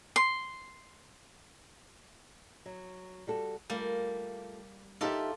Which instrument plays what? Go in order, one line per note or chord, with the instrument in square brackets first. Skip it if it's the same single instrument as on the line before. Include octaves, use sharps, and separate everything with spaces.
[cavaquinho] C6
[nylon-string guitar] F#3
G3 F#4 A4
[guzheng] G3 A#3 [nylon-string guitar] A3 F4
[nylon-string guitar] D#4 G4 E5 [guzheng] F4 A4 D5